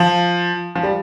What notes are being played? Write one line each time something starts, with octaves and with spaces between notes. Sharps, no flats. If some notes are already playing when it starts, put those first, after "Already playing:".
Already playing: F3
F3
G3